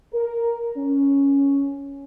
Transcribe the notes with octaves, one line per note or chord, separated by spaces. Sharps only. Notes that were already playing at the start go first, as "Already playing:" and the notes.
A#4
C#4